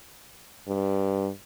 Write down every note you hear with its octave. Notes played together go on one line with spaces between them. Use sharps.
G2